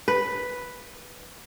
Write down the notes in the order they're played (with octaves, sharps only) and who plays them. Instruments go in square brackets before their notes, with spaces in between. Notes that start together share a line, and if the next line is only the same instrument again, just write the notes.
[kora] B4